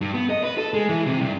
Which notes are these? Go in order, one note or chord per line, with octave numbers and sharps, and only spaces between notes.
G2
B3
D#5
B4
A4
G#3
E3
C3
G2